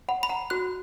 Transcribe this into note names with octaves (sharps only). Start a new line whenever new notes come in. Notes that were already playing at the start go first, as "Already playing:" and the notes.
F#5 B5
B5
F#5 A#5
F#4 F#6